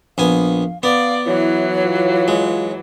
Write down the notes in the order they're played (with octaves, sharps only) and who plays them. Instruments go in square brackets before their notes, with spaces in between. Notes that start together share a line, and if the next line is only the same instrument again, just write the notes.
[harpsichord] A#1 B3 G#5 [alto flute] F5
[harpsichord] B3 [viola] D5 [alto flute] F5
[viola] E3 F#3 [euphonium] E4 [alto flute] C#5
[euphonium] F4
[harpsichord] G#3